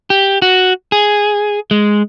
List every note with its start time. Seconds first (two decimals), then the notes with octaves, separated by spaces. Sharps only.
0.10 G4
0.42 F#4
0.92 G#4
1.71 G#3